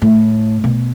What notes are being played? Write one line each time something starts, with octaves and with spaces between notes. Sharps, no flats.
A2
B2